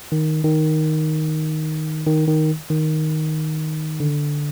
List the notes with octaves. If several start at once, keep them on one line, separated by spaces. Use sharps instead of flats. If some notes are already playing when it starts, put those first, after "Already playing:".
D#3
D#3
D#3
D#3
D#3
D3